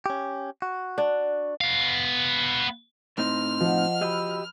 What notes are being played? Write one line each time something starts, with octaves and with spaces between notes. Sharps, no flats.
C#4 G4
F#4
D4
B3 F5
A2 C4 D#4 C6 F6
F3 D#5 F#5
F#4 G4 D#5 B5 E6